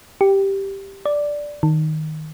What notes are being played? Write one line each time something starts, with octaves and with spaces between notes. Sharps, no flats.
G4
D5
D#3